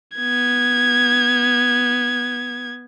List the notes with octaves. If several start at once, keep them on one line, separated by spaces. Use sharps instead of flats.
B3 G#6